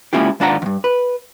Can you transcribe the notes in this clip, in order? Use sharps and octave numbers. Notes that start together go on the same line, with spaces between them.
G#3 A#3 C#4 E4 F4 G4
D#2 G#2 D4 F4 F#5 A#5
E2 G2
B4